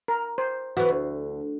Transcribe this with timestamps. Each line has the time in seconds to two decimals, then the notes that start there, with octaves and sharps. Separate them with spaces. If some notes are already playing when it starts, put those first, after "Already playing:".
0.08 A#4
0.38 C5
0.77 E3 B3 F#4
0.89 D2